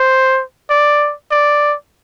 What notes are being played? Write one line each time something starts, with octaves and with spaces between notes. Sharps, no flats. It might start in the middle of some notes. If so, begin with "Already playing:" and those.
Already playing: C5
D5
D5